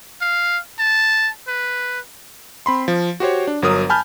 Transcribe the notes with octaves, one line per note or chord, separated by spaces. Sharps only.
F5
A5
B4
C4 B5 C6
F3
F#4 G4 C5 C#5
D4
G1 F#3 A#4 D#6
G#5 A5 B5 F6 G6